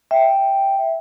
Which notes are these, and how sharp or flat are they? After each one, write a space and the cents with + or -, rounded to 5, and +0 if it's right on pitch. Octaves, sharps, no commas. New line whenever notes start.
E5 -5 G5 +0